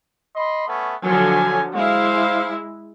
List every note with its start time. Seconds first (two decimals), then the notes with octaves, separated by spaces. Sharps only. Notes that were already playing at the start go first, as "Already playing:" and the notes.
0.35 D#5 B5 C6
0.68 A3 B3 C#4
1.03 D3 F3 F#3 G#5
1.75 G#3 E4 C5 F5